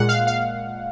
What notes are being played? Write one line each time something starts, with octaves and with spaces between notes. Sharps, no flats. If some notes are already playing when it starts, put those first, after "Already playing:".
Already playing: A#2 G#3 F#5
F5
F5